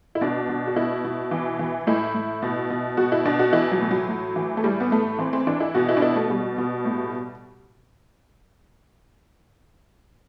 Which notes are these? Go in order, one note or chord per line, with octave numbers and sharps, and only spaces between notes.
E4
B2 D4
B2
F#4
B2 E4
B2
E3
E3
A2 E4
A2
B2
B2
B2 F#4
E4
B2 D4
F#4
E3 E4
F#3
A2
F#3
A2
E3
A3
A2 G3
B3
A2 A3
E3 C4
C4
E3 D4
E4
B2 F#4
E4
D4
B2 E4
A3
B2 G3
B2
A2